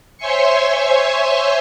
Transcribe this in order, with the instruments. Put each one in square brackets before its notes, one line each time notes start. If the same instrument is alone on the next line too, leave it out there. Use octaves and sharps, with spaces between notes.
[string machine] C5 C#5 E5 G#5 C6 C#6